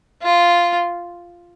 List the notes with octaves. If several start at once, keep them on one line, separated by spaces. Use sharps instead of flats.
F4